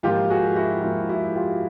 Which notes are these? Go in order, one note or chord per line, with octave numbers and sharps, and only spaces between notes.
G#2 F3 A#3 F4 G4
F#4 G#4
E4 F#4
G#2 F3 A#3 E4 F#4
E4 F#4
F4 G4